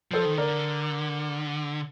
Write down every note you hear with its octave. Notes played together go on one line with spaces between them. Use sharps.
F3 A4 C5
D#3
D3 A#4 D5